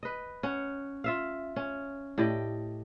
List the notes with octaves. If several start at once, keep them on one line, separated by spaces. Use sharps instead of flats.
B4 D#5
C#4 F#5
F4 E5 F5
C#4
A2 G4 D5 D#5